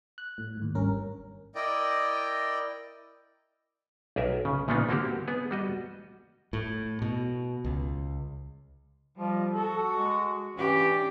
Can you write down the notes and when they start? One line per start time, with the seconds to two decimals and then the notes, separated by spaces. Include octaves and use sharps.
0.18 F#6
0.38 A2
0.57 D#2 G#2
0.75 G#1 G2 C#4 A#4
1.55 E4 A#4 D5 D#5 G5
4.16 B1 G#4 A#4 E5
4.45 C#3
4.68 A#2 C#3 F3 B3 D4 D#4
4.89 D3 A#3 C4 F#4 G4
5.28 B3 G#4
5.51 G3 F#4 D#5
6.53 A2
7.02 B2
7.65 C#2
9.17 F3 G3 D#5
9.53 F#4 A4
9.93 G#3
10.56 E3 C#4 D4 G4